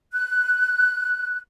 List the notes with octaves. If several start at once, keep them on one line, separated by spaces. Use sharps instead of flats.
F#6